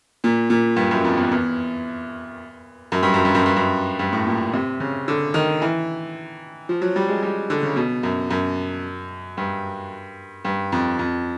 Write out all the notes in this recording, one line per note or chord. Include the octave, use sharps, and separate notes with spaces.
A#2
A#2
G2
F#2
F2
E2
E2
F#2
G2
F#2
G2
F#2
G2
F#2
G2
A2
A#2
C3
C#3
D3
D#3
E3
F3
F#3
G3
G#3
G3
D3
C#3
B2
F#2
F#2
G2
G2
F2
F2